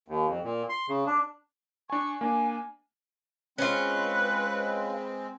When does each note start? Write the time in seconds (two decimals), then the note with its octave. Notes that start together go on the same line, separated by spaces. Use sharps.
0.08 D#2
0.28 F2
0.44 A#2
0.69 C6
0.89 C#3
1.06 D4
1.90 D4 G#5 C#6
2.21 A#3 D4 G#5
3.58 G#3 C4 C#4 F4 B4 F#6